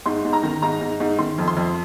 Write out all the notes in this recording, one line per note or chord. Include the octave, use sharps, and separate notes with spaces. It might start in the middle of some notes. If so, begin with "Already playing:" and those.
G#2 C6
G#2
A#5
D#3
G#2 A#5
G#2
G#2
D#3 C6
F2
C6
F2